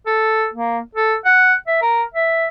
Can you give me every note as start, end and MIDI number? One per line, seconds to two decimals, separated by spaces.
0.06 0.47 69
0.54 0.79 58
0.95 1.15 69
1.25 1.54 78
1.67 1.77 76
1.82 2.03 70
2.14 2.48 76